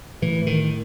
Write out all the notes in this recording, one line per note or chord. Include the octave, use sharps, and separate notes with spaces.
A2 E3
D#3